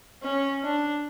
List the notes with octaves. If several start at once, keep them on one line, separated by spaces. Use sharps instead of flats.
C#4
D4